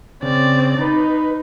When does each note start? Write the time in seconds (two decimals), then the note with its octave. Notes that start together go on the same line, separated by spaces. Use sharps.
0.22 C#3 C4 D5
0.81 D#4 B4